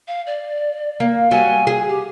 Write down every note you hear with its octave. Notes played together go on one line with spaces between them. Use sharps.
F5
D5
A#3
F#3 G3 G#5
G#4
G4